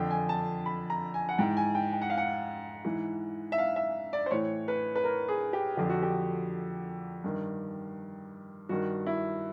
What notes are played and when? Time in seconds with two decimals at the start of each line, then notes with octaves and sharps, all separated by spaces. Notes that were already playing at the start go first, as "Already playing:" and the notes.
Already playing: F2 D3 G5
0.11 G#5
0.29 A5
0.66 B5
0.90 A#5
1.14 G#5
1.29 F#5
1.38 G#2 E3 G5
1.57 G#5
1.75 G5
1.93 G5
2.02 F#5
2.10 F5
2.18 F#5
2.85 G#2 E3
3.52 E5
3.58 F5
3.76 E5
4.13 D5
4.26 C5
4.31 A2 E3 C#5
4.68 B4
4.96 B4
5.04 A#4
5.28 G#4
5.53 G4
5.77 F2 D3 G4
5.89 F#4
6.02 G4
7.24 G2 D#3
8.69 G2 D#3 F#4
9.06 E4